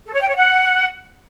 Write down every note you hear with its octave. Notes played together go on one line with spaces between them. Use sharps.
A4
C#5
G5
C#5
F#5